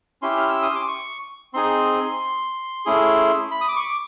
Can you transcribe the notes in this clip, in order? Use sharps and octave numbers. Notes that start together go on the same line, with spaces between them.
C#4 E4 G4 C6
F6
E6
D#6
D6
C#6
C4 D#4 G#4 C6
A3 C#4 E4 G#4
B5
D#6
D6
C#6
D6